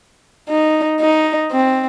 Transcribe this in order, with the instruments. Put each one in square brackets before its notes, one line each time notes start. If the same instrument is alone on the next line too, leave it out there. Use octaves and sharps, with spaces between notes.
[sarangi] D#4
D#4
C4